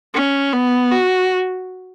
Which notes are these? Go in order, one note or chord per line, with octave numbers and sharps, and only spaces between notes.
C#4
B3
F#4